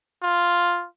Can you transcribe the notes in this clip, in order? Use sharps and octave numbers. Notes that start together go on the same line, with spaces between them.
F4